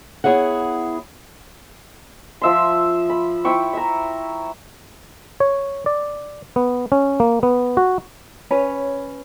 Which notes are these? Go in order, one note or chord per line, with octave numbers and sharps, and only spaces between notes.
B3 E4 G#4 C#5 E5 F#5
F3 E5 C6
B5
E4 C5 G5 C#6
E5 A#5
C#5
D5
B3
C#4
A#3
B3
F#4
C#4 B4 C#5